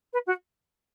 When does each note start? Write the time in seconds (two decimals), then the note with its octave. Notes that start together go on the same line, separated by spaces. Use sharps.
0.13 B4
0.27 F#4